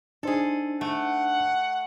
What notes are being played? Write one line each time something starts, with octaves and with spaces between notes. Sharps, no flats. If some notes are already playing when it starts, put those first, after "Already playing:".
D4 D#4 G#4 A4 C5
A3 F#5